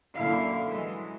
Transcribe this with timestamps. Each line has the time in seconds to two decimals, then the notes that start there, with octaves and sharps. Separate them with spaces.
0.16 F#2 A#2 D3 E4 F5
0.67 E3 F#3 G#3